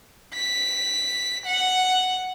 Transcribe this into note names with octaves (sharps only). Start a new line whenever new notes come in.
B6
F#5